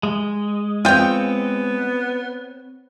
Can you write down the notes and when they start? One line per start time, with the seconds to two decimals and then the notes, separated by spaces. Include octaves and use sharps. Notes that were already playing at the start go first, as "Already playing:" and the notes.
0.03 G#3
0.85 B3 C4 F4 C#5 G5